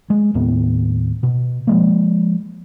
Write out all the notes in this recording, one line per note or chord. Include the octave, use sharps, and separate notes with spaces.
G#3
D#2 A2 B3
B2
F3 G#3 A#3